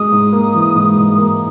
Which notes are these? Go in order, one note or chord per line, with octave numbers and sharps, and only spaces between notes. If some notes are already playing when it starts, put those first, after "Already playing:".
Already playing: G#3 D#6
G#2
A#3
E3
G#2
G#2
A#3